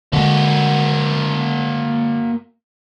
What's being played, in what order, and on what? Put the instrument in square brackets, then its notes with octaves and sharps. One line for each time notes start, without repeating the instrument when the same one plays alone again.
[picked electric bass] D3 G#3 [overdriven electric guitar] A#3 F#4